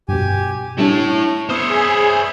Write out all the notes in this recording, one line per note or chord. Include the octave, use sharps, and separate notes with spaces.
G2 B2 G4 G#5
G3 A3 D4 E4 C#5 A5
B3 C5 C#5 E5 B5 D#6 F6
G#4